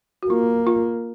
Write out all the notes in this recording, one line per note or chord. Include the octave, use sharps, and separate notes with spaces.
F#4
A#3 F4
F4